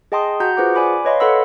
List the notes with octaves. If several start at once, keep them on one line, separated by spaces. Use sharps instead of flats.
G#4 D#5 G5 A5 C6 D#6
F#4 F#5 A#5 G6
F4 G#4 B4 C5 F#5 D6
D5 G#5 B5 D6
B4 C#5 D#5 F5 B5 C6
A4 B4 F#5 B5 C6 E6